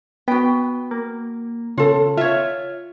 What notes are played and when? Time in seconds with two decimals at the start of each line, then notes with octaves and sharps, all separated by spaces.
0.28 B3 F#4 G5
0.91 A#3
1.78 C#3 F4 A4
2.17 F4 C#5 E5